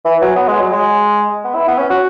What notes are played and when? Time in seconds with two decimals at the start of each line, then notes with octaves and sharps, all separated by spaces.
0.05 E3
0.21 F#3
0.36 B3
0.48 G#3
0.61 F#3
0.72 G#3
1.44 B3
1.55 E4
1.68 B3
1.78 C#4
1.90 F#4